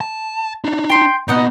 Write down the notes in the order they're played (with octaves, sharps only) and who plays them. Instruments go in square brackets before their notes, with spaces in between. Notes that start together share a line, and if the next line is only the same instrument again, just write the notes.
[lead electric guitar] A5
D4 D#4
[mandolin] G5 C6
[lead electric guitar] A#2 B3 [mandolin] D#4 D#5 F#5